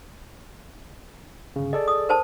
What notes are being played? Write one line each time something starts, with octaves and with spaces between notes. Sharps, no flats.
G1 C#3
G#4 A4 D5 D#5
D#6
A#4 C5 A5